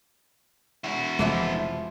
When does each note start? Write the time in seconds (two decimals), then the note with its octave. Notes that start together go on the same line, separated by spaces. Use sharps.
0.84 E4 F#4
1.19 F1 E3 F3 G#3 E5